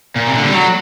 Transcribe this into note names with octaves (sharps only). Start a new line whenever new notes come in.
A#2
C3
D3
G3
F#3